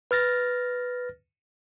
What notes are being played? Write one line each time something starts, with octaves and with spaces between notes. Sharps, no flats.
B4 F6 A6 A#6